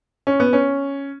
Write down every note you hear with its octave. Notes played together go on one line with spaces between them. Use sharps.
C#4
B3
C#4